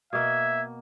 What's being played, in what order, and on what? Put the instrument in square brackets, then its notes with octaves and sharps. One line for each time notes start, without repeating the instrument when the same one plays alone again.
[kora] B2 A#3 [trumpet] E5 [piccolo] G#6